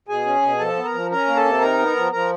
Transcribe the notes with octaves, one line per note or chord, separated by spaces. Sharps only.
B2 G#4 G#5
C#4
B2
F3 A4 A5
B3
A#4 A#5
F3
C#4 A#4 A#5
A#3
A4 A5
C3
D#4 A#4 A#5
B3
F3
F3 A#4 A#5